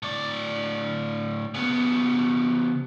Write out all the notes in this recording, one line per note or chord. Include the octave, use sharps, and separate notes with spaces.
A2 D5
C#3 B3